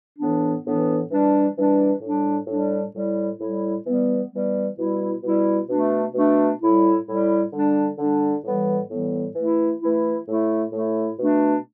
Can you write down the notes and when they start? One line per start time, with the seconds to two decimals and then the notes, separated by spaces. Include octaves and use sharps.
0.19 A2 E3 B3 D4
0.64 A2 E3 B3 D4
1.10 E3 G3 D4
1.56 E3 G3 D4
2.01 A2 G3 D4
2.47 A2 G3 D4
2.94 A2 G3 E4
3.39 A2 G3 E4
3.85 E3 G3 B3
4.31 E3 G3 B3
4.77 B2 G3 E4
5.23 B2 G3 E4
5.68 B2 A3 D4
6.14 B2 A3 D4
6.61 A2 G3 E4
7.06 A2 G3 E4
7.52 D3 G3 D4
7.98 D3 G3 D4
8.44 A2 E3 G3 B3
8.90 A2 E3 G3 B3
9.35 E3 A3 E4
9.81 E3 A3 E4
10.27 A2 A3 E4
10.73 A2 A3 E4
11.19 B2 A3 D4